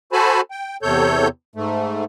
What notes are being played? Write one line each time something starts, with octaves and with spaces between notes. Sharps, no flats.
F#4 A4 C5 G#5 A5 B5
G5
E2 C3 A4 C#5 G6
G#2 A3